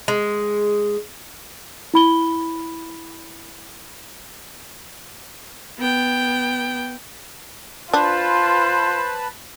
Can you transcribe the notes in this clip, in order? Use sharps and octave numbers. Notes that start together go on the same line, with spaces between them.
G#3
E4 B5 G7
B3 G5
D4 F4 B4 C5 A5 B5